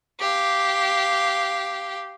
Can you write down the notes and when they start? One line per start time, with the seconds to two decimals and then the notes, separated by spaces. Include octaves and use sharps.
0.21 G4 F5